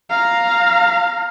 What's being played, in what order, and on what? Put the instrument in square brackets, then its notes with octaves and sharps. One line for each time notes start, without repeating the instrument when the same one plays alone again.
[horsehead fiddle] F5 A#5